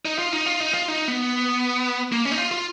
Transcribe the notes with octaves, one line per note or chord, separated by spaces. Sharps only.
D#4
F4
D#4
F4
D#4
F4
D#4
B3
A#3
C#4
D#4
F4
F4